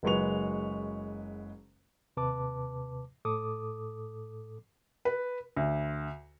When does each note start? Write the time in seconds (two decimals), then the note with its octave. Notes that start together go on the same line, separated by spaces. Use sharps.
0.03 F#1 F#3 G#3 B4 C#6 F7
2.17 D#2 C3 B4 A5 D6
3.25 A2 A4 D6 D#6
5.05 B4
5.57 D2